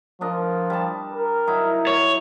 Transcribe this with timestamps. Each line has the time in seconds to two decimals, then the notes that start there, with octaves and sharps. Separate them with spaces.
0.21 F3 D4 A#4 D#5
0.70 G3 A5
1.13 A#4
1.47 F#3 D#4 E4
1.87 C#5